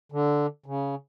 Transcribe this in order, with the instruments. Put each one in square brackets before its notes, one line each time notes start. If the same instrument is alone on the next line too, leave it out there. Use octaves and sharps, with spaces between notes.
[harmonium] D3
C#3